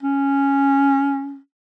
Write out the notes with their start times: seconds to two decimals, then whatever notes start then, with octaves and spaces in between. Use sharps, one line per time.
0.03 C#4